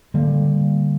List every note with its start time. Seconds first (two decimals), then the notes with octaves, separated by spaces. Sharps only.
0.14 D3 G3 A#3